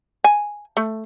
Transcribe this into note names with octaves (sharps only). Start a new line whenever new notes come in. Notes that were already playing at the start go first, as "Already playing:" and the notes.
G#5
A3